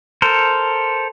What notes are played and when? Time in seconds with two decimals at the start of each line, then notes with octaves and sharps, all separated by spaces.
0.22 A4 A#4 C5